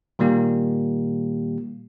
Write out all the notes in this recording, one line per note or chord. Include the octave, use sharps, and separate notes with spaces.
A#2 D#3 G3 A#3 G4